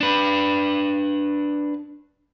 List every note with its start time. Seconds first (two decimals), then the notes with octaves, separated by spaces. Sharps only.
0.01 D4 B4